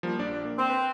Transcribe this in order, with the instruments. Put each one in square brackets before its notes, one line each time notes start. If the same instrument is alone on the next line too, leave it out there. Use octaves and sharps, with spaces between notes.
[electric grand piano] F3 G3 A#3
A#1 D4 D5
A#3
[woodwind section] C4
[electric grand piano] B4